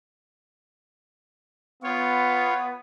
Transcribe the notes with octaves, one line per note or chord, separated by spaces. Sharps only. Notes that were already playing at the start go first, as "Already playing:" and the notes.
B3 F4 C#5